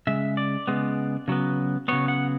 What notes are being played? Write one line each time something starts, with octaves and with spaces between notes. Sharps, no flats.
C#3 G#3 E5
D5
C#3 G#3 B3
C#3 F#3 B3
C#3 F#3 B3 C#5
F#5